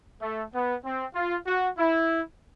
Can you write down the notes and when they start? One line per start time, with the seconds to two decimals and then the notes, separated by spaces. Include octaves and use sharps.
0.22 A3
0.54 B3
0.85 C4
1.15 F4
1.47 F#4
1.78 E4